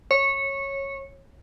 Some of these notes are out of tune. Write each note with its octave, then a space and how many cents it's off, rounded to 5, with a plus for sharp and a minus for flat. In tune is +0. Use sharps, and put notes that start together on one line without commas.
C#5 -15